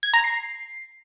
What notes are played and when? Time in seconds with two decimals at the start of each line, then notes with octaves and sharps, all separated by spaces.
0.03 G#6
0.13 A#5
0.24 C7